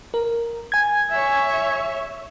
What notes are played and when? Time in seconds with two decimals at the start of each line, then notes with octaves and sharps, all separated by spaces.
0.14 A#4
0.72 G#5 G#6
1.10 C#5 E5